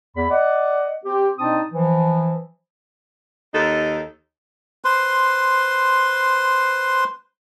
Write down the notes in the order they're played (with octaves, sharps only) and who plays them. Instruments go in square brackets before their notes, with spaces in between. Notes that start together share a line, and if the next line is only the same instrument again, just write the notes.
[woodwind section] E2 B5
D5 D#5 F#5
C4 G4
B2 C4 D4 D#4 A5 D#6
E3 F3
[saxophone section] D#2 D#4 A4
[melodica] B4 C5 C6